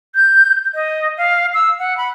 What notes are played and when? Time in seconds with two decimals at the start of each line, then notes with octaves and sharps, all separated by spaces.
0.15 G6
0.74 D#5
1.18 F5
1.54 E6
1.79 F#5
1.97 B5